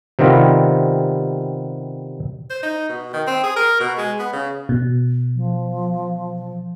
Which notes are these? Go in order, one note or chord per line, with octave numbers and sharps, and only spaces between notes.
C3 D#3 G3 B3 F4
C5
D#4
B2
D#3
C4
G#4
A#4
B2
G#3
B3
C#3
B2
F3